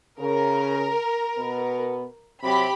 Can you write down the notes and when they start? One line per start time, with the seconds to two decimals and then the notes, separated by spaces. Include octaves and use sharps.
0.19 C#3 A#4
1.38 B2 B3
2.43 C3 F#3 C4 G4 B5